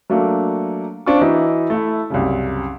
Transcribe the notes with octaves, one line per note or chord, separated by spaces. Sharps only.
F#3 A3 A#3 D4
C4 D4 F4 C#6
E3 D#4 E4 F#4
A3 E4
C2 F#2 C#3